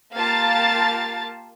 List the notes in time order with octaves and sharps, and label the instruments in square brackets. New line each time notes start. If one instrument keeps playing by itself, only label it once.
[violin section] A#3 F4 G4 F5 A5 A6